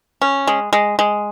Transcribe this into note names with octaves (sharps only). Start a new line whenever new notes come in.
C#4
G#3
G#3
G#3